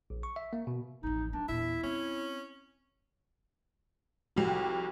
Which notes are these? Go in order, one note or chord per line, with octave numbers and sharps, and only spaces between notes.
A#1
C#6
E5
A#3
B2
A1 F2 D#4
F#3 A#3 D4
E2 A#2 E4 E5
C4 C#4
C2 F2 F#4 G4